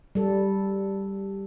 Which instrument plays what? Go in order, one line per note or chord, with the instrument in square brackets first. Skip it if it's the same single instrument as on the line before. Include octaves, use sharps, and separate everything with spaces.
[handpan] G3 A4